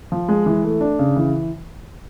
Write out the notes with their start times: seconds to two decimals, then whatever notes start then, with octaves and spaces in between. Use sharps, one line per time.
0.12 F3
0.28 G#3
0.46 E3
0.64 A3
0.81 D4
0.99 C#3
1.16 E3